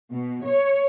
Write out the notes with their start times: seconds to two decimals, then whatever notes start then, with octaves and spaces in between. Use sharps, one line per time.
0.11 B2
0.45 C#5